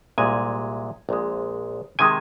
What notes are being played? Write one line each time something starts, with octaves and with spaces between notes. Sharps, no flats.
C2 A#2 G#3 G#5
A#1 A#2 G#3
C3 D#3 G#3 G#5